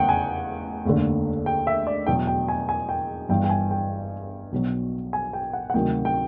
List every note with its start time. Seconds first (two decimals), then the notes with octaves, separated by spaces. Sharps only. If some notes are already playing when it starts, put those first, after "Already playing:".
Already playing: F1 E2 C#3 F#5 G5
0.09 G#5
0.85 F1 D#2 D3
1.46 G5
1.67 E5
1.87 D5
2.07 E2 B2 F#3 G5
2.27 G5
2.48 G#5
2.69 G#5
2.89 G5
3.29 G1 G2 E3 G5
3.44 G5
3.49 G#5
3.71 G5
4.52 B1 B2 F#3
5.13 G#5
5.33 G5
5.53 F#5
5.70 F#5
5.74 D2 C3 D#3 F#3 G5
6.05 G5